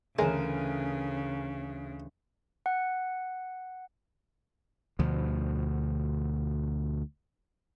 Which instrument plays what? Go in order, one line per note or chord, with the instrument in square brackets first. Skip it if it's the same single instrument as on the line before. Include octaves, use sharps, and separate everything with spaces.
[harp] D2 E3 E7 [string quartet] C#3 [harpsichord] G#3 [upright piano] A#4 C#5 G#5
[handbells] F#5
[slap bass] D2 B2 F3